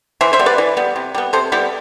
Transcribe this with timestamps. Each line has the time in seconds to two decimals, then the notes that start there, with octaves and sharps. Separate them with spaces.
0.21 E3 C5 E5
0.33 C5 E5
0.39 G3 B3
0.46 B4 D5
0.58 E3
0.77 G3 B3
0.96 C3
1.15 G3 B3
1.33 C3 A4 C5
1.52 G3 B3 E4 G4